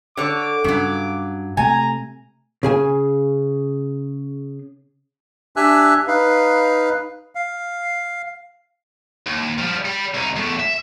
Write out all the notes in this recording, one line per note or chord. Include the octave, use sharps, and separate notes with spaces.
D3 C#5 D6
G2 C#3 F#3
C3 A3 G#5 A#5
C#3 G#4 G#5
D4 G4 E5 G#5 E6 F#6
D#4 B4 F5
F5
D#2
F3 G3
G3
C2 D#4
E2 A2
E5